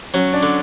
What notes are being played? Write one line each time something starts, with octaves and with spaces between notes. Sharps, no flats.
F#3 C#4 C#5
D4 D5
D3